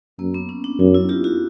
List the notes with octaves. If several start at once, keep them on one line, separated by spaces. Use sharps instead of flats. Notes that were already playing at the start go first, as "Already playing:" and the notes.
F#2 A#3
B3
C#4
D4
F#2 D#4
E4
F4 G4
E4 F#4